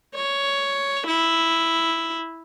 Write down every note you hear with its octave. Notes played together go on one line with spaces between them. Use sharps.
C#5
E4